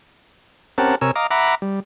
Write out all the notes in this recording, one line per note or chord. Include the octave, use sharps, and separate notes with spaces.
C4 C#4 G4 A#4 F#5 A5
C3 A#4 C#5 G#5 E6
D#5 F5 A#5 D6
E5 F#5 A#5 B5 D6
G3